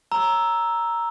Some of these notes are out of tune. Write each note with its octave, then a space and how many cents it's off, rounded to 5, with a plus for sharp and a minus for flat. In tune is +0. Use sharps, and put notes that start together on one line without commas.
A#5 +0 E6 +0